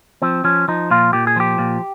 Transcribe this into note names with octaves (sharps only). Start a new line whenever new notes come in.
F3 C4
F3 C#4
F3 D#4
A#2 F4
A#2 G4
G#4
F3 G4
A#2